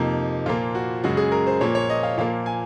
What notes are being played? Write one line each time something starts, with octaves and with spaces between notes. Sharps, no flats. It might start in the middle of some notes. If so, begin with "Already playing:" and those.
Already playing: F2 C3 F3 A#3 D#4
A#2 F3 A#3 F4
F#4
F#2 C#3 G#3 F#4
G#4
A#4
C5
A#2 F3 A#3 C#5
C#5
D#5
F5
A#2 F3 A#3 F5
G#5